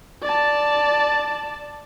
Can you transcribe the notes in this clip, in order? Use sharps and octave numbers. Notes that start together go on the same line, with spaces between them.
D5 A5